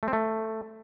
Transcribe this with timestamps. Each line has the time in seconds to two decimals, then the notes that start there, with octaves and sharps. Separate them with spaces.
0.03 A3
0.08 C4
0.13 A3